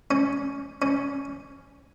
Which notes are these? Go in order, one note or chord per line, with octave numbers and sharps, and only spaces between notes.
C#4
C#4